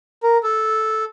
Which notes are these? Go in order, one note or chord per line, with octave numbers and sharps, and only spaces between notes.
A#4
A4